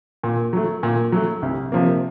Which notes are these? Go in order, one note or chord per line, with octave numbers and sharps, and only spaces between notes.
A#2
F#3 A3
A#2
F#3 A3
C2
C3 F3 A#3